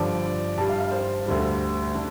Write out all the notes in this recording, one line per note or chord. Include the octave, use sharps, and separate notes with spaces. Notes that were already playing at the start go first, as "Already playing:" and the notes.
Already playing: G2 D3 F3 D5
G2 G3 A5
F5
F5
C5
D2 D3 G3
D3